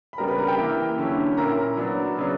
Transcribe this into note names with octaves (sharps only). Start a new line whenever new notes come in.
B5
C#3 G3 B3 D4 A#4 A#5
B4 B5
A#4 A#5
G4 G5
E3 A#3 E4
D3 F#3 C#4 E4
A#2 A#3 C#4 E4 A#4 A#5
F#3 B3 D4
C#3 F#3 B3 D4